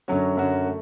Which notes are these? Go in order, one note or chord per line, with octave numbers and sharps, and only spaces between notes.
F#2 D3 F#3 C#4 F#4
F#2 D3 F#3 C#4 F#4
A3